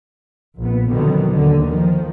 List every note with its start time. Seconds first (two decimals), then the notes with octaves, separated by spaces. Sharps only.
0.57 A#1 B3
0.88 F2 B2 D3 D#3 F#3
1.32 D#2 D3
1.68 D#3 F3